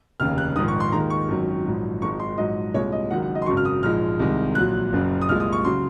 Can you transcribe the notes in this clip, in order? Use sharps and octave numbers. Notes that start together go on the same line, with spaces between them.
F1 D#2 C#3 F6
F#6
A#1 G#2 D#3 D#6
C#6
C6
D#2 D#3 G#3 A#5
C#6
G#1 F#2 D#3 F#3
A#1 G#2 F#3
G#1 G#2 D#3 G#3 C#6
C6
A#1 G#2 F#3 D#5
C2 A#2 G#3 C#5
D#5
F#1 F#2 D#3 G#3 F#5
F#5
D#5
C6
G#1 F#2 C#3 F#3 C#6
F6
D#6
A#1 G#2 F3 G#3 F6
C2 C3 D#3 G#3
A#1 A#2 F#3 F#6
F#1 F#2 C#3 F#3
D#6
C2 A#2 G#3 F6
D#6
C#6
C#3 F#3 C6